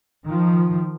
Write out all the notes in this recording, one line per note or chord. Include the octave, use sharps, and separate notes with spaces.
D#3 F3